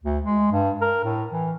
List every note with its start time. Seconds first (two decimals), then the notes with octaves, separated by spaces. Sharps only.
0.03 D2
0.24 G#3
0.52 G2
0.81 A#4
1.04 A2
1.32 E3